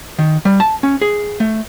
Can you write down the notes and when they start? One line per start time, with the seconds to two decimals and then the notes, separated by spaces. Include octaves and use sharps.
0.19 D#3
0.45 G3
0.60 A5
0.83 C#4
1.01 G#4
1.40 A3